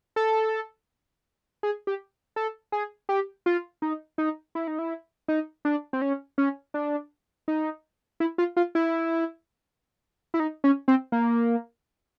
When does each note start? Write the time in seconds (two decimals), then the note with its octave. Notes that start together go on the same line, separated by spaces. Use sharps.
0.16 A4
1.63 G#4
1.87 G4
2.36 A4
2.72 G#4
3.09 G4
3.46 F4
3.82 D#4
4.18 D#4
4.55 E4
4.67 D#4
4.79 E4
5.28 D#4
5.65 D4
5.93 C4
6.02 C#4
6.38 C#4
6.74 D4
7.48 D#4
8.20 E4
8.38 F4
8.57 F4
8.75 E4
10.34 E4
10.40 D#4
10.64 C#4
10.88 C4
11.12 A#3